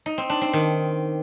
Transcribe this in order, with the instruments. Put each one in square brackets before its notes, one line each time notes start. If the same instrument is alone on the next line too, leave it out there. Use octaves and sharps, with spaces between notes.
[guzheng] D#4
C4
D4
C4
D#3